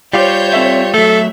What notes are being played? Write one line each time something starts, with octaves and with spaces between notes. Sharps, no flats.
G3 F4 G4 C5 C#5 G6
C4 A4 E5
F#3 A3 A4 E5